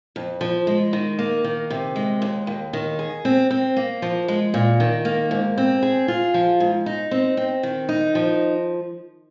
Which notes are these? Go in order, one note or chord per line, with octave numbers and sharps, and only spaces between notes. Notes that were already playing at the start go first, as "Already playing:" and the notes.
F2
F3
G#3
D#3
A#3
D#3
C3
G#3
D#2
D#2
D#3
G#4
C4
C4
A#3
F3
G#3
A#2
D#3
A#3
G#2
C4
G#4
F4
F3
G#2
D#4
C4
C4
D#3
D#4
F3